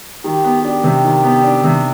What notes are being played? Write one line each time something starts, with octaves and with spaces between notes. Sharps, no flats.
D#3 G4
B3
D4 G4
C3
D#3
B3
D4
C3